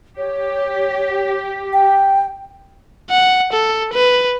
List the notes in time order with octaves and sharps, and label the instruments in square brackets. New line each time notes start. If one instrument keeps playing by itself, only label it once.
[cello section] G4 [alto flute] C#5
[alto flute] G5
[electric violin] F#5
A4
B4